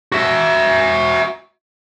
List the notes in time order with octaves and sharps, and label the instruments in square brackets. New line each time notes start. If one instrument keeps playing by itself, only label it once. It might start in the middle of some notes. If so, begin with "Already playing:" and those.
[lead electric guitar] F#4 E5